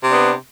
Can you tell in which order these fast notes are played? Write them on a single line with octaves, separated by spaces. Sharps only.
C3 D4 B3